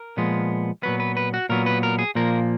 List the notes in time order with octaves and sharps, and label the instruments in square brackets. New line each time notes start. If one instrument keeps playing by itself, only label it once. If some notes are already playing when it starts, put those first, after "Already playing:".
Already playing: [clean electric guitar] A#4
A#2 F3 G#3 B3
A#2 F#3 B3 B4
B4
B4
F#4
A#2 F#3 B3 A#4
B4
A#4
G#4
A#2 F3 A#3 A#4